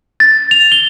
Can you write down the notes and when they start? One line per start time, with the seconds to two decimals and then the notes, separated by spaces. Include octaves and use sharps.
0.20 A6
0.51 F7
0.72 G7